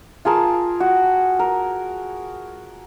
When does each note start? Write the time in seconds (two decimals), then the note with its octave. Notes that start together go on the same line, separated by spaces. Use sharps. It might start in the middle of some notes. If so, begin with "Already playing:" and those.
0.25 F4 G#4 A#4 A5
0.80 F#4
1.39 A#4